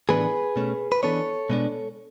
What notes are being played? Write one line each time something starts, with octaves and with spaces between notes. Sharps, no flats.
A2 E3 B3 D4 G#4 B4
B2 A3 C#4
B4
E3 B3 D4 A4 C#5
B2 G#3 B3 D4